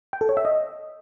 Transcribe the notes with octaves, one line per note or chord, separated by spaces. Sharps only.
G5
A4
C#5
E5
D#5